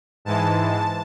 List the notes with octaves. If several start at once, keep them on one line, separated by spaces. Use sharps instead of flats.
G#2 E3 G#3 A5
A5